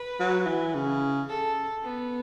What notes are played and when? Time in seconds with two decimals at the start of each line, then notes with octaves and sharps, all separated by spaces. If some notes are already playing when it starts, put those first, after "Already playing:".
Already playing: B4
0.20 F#3
0.47 E3
0.75 C#3
1.29 A4
1.84 B3